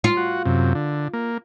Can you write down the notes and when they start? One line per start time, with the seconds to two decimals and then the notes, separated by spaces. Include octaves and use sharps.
0.04 F4
0.17 F#4
0.45 F#2 C3
0.75 D3
1.13 A#3